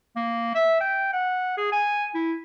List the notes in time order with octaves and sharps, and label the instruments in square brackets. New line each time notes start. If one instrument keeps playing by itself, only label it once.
[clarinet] A#3
E5
G5
F#5
G#4
G#5
E4